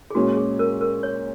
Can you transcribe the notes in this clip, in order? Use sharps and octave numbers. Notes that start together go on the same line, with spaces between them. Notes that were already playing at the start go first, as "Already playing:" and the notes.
G#4
A#2 G#3 C#4 F#4
G#4
A#4
A#4
C#5